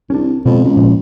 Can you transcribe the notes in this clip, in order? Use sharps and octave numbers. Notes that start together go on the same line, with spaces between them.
C2 C#4 D4
F2 B2 G#3 B3
C#2
A#2 F3